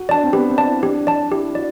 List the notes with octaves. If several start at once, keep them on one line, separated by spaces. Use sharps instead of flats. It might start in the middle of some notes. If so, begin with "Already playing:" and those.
Already playing: F#4
D4 D5 A5
C4
B3 G4
C4
D5 A5
E4
D4 G4
D5 A5
E4 G4
F#4 D5